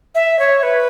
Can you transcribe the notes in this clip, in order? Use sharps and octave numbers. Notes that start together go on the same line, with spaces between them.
E5
C#5
B4